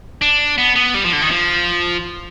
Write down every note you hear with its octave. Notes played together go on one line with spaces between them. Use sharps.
D4
B3
B3
G3
F3
D3
D#3
F3